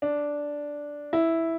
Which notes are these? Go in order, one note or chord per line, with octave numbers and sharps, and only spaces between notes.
D4
E4